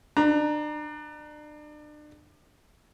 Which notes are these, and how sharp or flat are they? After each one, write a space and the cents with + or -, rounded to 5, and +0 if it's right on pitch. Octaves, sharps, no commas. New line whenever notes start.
D4 +35 A#5 +10